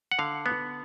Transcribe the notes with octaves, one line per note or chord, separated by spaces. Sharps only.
F#5
D3 F5
B3